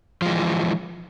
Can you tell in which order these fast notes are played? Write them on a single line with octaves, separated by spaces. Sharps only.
F3 G#3 E3